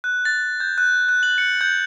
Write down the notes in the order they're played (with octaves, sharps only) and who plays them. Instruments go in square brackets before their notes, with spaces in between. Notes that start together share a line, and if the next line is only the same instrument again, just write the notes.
[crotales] F#6
A6
G6
F#6
F#6
F#7
C#7
G6